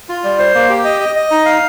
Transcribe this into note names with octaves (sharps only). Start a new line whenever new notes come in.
F4
G3
C5
A#3
G4
D#5
D#5
D#5
D#4
F5